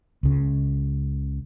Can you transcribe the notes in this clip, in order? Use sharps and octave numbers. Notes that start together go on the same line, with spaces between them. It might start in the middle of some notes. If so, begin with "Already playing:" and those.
C#2 C#3